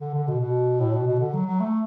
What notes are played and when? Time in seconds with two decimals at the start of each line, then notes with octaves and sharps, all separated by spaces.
0.01 D3
0.14 D3
0.28 B2
0.41 B2
0.80 A2
0.93 B2
1.07 B2
1.20 D3
1.33 F#3
1.46 F#3
1.60 A3